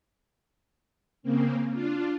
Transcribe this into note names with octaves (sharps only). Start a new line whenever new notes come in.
C#3 A#3 C4
D4 F4